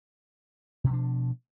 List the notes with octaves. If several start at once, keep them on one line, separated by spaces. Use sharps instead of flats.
B2 F3 C#4 D4